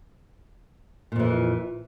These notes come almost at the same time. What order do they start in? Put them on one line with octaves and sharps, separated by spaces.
A#2 F2 E3